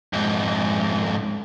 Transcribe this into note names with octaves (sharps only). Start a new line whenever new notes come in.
F2 G#2